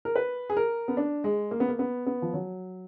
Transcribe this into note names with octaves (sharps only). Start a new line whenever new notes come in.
A#4
B4
G#4
A#4
B3
D4
G#3
A#3
B3
A#3
B3
B3
F3
F#3